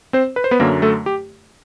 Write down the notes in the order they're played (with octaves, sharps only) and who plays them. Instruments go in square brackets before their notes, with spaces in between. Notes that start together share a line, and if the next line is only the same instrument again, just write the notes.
[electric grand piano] C4 C5
B4
C5
B3 B4
F#2 D3 F#3 A#3 A#4
A3 A4
G4